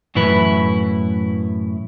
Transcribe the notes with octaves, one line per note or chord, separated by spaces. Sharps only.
F#2 A2 E3 E4 B4